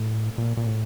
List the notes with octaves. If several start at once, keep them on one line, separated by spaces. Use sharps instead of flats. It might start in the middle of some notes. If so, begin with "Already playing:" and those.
Already playing: A2
A#2
A#2
A2